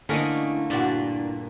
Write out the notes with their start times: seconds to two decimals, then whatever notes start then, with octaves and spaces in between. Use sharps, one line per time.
0.09 D3 A3 A#3 C#4 D4 E4 A#4 D#5
0.70 G2 A#2 D4 F#4